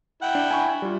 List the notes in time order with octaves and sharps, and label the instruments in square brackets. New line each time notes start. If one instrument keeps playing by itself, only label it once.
[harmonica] E4 F#5 G5
[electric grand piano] D4
G#5 B5 C#6
G3 F4